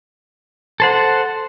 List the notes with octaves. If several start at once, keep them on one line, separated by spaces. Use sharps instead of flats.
A4 C5 F#5